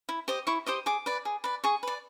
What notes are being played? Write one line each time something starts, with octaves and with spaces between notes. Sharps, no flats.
E4
G4 C5 D#5
E4 C#6
G4 C5 D#5 D6
G#4 D6
B4 D5
G#4
B4 D5
G#4 C#6
B4 D5